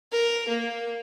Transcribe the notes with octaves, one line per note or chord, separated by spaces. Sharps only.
A#4
A#3